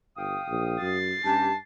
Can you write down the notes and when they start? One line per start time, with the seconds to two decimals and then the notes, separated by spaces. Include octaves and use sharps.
0.17 G1 F5 G5 D#6
0.49 A#1
0.81 F#2 A6 C7
1.25 G2 C#4 G4 A5